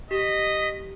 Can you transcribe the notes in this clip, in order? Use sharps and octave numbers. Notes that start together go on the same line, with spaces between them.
G4 D#5 B6